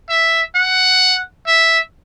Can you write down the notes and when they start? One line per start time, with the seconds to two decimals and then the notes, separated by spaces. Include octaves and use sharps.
0.09 E5
0.55 F#5
1.47 E5